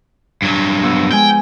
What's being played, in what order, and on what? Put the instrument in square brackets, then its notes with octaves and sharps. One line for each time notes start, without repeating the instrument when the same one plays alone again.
[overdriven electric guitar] G2 F#3
[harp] F3 B3 E6
[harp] G#3 G#5 [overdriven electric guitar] G5